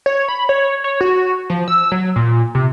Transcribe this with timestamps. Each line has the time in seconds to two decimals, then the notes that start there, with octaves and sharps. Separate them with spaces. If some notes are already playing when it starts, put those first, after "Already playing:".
0.06 C#5
0.28 B5
0.49 C#5
0.84 C#5
1.01 F#4
1.50 F3
1.68 E6
1.92 F#3
2.16 A#2
2.55 C3